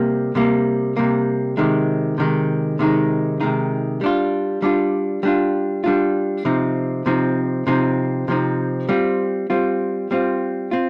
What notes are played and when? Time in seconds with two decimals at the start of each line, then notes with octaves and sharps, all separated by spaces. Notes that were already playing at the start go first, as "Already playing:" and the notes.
Already playing: C3 G3 A#3
0.35 C3 G3 A#3
0.97 C3 G3 A#3
1.57 C3 D#3 G#3 D#4
2.18 C3 D#3 G#3 D#4
2.79 C3 D#3 G#3 D#4
3.40 C3 D#3 G#3 D#4
4.01 G3 D4 F4
4.62 G3 D4 F4
5.23 G3 D4 F4
5.84 G3 D4 F4
6.45 C3 F3 C4 D#4
7.06 C3 F3 C4 D#4
7.67 C3 F3 C4 D#4
8.28 C3 F3 C4 D#4
8.89 G3 C4 F4
9.50 G3 C4 F4
10.11 G3 C4 F4
10.71 C4 F4